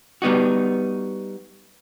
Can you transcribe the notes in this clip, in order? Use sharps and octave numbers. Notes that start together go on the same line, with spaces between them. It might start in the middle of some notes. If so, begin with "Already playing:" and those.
G3 B3 D#4 F#4